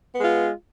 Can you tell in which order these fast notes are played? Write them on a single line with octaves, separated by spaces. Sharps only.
B3 G#3 F4